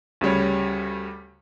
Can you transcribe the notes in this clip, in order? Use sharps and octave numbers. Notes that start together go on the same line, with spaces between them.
D2 C#3 G3 C#5